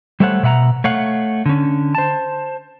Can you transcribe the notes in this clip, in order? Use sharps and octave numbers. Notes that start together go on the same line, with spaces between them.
G3 A3 A4 C5 C#5 F#5
B2 E5 F#5 A5 A#5
A3 C#5 F5 F#5
D3 C#4
C5 A5